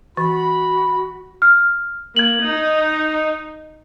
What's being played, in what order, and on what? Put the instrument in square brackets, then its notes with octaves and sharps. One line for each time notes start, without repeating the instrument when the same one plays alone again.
[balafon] E3 [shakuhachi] F#4 [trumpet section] B5
[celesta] F6
[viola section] A#3 [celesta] G#6 F#7
[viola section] D#4